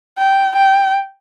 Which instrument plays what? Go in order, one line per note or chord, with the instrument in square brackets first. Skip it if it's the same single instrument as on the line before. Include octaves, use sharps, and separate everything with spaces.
[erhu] G5
G5